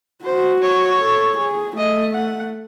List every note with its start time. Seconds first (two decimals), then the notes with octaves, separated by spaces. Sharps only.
0.25 F#4 C5
0.62 C#5
1.01 A4
1.38 G#4
1.77 A3 D#5
2.15 F#5